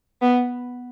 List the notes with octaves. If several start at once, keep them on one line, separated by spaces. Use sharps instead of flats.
B3